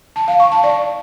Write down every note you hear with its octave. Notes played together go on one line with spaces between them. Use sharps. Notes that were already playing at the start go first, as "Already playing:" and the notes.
A5
F5
C#6
A5
D5